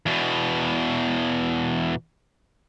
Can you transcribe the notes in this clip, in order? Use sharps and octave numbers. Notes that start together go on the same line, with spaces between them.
E2 B2